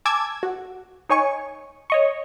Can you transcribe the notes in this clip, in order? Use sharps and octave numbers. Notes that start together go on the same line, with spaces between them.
G#5 A5 D6 E6 G#6
F#4
D#4 C#5 G#5 C#6
C#5 D#5 C#6